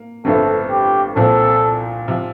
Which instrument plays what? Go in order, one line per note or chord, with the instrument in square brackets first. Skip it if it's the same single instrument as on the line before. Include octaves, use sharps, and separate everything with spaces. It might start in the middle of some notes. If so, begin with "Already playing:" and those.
Already playing: [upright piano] A#3
[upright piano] G1 G2 F3 A3 C4 [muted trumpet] A4
[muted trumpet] G4
[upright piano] C2 A#2 F3 C4 [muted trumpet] A4
[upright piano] C3 F3